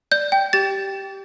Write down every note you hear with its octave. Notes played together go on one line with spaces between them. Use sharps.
D5 G6
G5
G4 A6